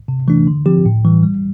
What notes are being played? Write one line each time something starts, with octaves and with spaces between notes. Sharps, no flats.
C3
E3 A3 D4
D3
F3 C4 G4
A2
E3 G3
G3